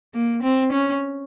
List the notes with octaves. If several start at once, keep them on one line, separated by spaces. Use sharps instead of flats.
A#3
C4
C#4